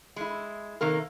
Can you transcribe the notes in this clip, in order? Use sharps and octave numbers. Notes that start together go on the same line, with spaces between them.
G#3 E4
C3 D#3 A#3 A#4